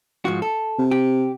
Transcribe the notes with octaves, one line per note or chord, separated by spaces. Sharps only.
G#2 F3 F#4
A4
C3
G4